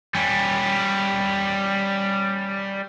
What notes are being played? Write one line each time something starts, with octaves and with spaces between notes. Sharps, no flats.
G3 C#4